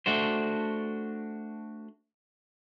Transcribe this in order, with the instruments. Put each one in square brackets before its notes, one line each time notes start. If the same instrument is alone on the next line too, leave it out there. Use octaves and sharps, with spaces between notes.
[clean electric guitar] A3 D4 F#4 C5